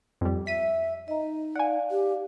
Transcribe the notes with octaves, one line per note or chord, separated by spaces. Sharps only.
F2 G3
E5 B6 D#7
D#4 D#5 A#5
D5 F5 F#5 G#5
G4